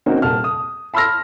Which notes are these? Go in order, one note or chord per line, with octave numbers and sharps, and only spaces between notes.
D#3 A#3 C4 C#4 D#4 F#4
D#1 A#3 A5 F6
D#6
A5 B5 C6 E6 F6 A#6